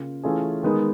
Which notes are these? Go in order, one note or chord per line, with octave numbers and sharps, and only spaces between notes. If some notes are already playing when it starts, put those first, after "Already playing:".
Already playing: C#3 A#3 F4
E3 A3 C#4 F4 G#4
D#3 G#3 B3 D#4 G#4